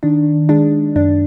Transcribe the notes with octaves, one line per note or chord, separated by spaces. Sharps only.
D#3 D4
G#3 D4
F#2 D4